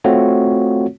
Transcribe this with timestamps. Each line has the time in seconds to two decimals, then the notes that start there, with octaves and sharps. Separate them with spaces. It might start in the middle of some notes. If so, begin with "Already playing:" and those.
0.04 A3 C4 F4 F#4 C#5